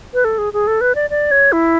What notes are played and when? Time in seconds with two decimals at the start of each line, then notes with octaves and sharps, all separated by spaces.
0.14 B4
0.25 A4
0.38 G#4
0.53 G#4
0.67 A4
0.81 B4
0.95 D5
1.10 D5
1.31 C#5
1.52 E4